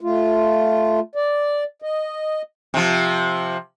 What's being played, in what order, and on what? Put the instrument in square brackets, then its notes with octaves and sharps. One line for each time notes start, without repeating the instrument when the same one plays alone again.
[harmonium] A3 F4
D5
D#5
[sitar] C3 F3